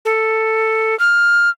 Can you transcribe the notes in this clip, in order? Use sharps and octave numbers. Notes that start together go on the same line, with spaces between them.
A4
F6